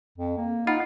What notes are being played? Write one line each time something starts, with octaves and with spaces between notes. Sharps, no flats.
F2
A#3
D#4 F4 F#5 B5